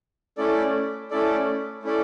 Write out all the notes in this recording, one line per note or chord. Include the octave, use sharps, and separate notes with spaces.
A3 C#4 E4 A4 D5
A3 C#4 E4 A4 D5
A3 C#4 E4 A4 D5